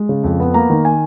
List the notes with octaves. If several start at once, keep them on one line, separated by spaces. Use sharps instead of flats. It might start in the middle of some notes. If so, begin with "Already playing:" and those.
Already playing: G#3
C#3
F2
B3
A#3 A#5
D#3
G#5